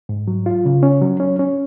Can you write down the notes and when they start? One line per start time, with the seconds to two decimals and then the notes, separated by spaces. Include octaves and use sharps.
0.09 G#2
0.28 F#3
0.46 F4
0.65 C#3
0.83 C#4
1.02 F#3
1.20 C#4
1.39 C#4